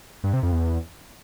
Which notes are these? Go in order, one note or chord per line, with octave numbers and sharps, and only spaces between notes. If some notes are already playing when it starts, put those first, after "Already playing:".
G2
C3
F2
E2